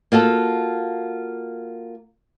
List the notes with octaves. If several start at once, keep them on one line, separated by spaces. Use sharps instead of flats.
A#3 F4 F#4 A4